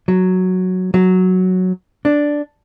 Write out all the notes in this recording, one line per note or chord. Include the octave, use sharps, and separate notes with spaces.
F#3
F#3
D4